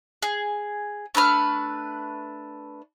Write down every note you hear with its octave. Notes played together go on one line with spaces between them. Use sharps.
G#4
A3 D4 B4 F6